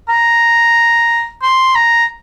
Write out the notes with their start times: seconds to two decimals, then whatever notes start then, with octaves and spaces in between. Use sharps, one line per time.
0.09 A#5
1.42 C6
1.75 A#5